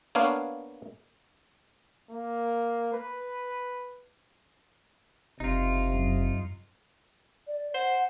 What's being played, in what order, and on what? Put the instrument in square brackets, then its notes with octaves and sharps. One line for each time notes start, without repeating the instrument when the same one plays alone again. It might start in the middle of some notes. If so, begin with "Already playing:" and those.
[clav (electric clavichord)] A#3 B3 D4 C#5 F5
[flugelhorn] A#3
B4
[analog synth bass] F#1 [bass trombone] C3 [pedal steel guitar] D#4 F4
[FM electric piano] F#2
[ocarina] D5
[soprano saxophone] C5 [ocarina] F#5